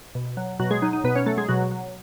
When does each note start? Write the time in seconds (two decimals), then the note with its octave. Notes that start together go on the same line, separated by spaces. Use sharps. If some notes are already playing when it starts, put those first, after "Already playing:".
0.15 B2
0.37 F#3
0.59 B2 F#3 F#4
0.71 G#3 G#4
0.82 F#3 D#4
0.93 D#4
1.04 B2 B3 B4
1.15 C#4 C#5
1.26 F#3 A3 A4
1.37 G#3 G#4
1.49 B2 F#3 F#4
1.71 F#3